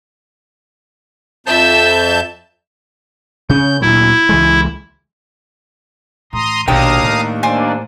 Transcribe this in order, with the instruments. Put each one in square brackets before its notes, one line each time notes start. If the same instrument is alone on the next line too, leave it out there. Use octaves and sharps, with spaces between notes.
[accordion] F2 A5 G6 [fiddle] E5
[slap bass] C#3 C#4 [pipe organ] G6
[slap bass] D2 A#2 F#3 [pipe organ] E4
[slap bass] C#2 E3 G#3
[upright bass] A2 E3 [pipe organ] A#5 C6 D#6
[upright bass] A#1 B2 [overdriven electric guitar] D#2 [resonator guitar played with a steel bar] D4 G5 [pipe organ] F5 A#5 D#6
[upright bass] A2
[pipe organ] A#3 D4 [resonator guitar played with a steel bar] C5 D5 G#5